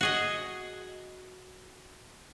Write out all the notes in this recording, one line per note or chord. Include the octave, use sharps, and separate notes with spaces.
F#4 G#4 D#5